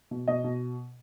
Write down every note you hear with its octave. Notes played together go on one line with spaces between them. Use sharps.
B2
B2 D#5
B2